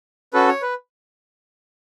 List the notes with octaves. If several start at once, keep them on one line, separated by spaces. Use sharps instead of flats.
C#4 F#4 A4 B4
C#5
B4